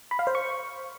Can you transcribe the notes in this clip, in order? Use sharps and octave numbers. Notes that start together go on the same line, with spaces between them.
B5
F5
C5
C#6